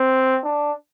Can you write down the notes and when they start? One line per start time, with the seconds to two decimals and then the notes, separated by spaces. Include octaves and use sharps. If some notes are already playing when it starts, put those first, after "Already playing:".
Already playing: C4
0.44 D4